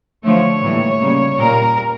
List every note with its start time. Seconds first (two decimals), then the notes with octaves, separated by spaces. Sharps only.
0.24 D3 F3 A3 C#5
0.62 A2 E3 G3 A#3
1.00 C#3 G3 A#3
1.38 A#2 G3 A#3 A#4